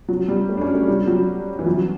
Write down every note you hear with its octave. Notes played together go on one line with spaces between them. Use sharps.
F#3
G3
A3
D4
C#4
A3
G3
F#3
E3
F#3